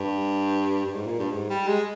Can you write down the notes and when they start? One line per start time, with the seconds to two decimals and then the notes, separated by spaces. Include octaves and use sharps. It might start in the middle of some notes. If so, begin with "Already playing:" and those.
Already playing: G2
0.85 G2
0.94 G#2
1.06 A#2
1.19 G2
1.31 G#2
1.50 G3
1.68 G#3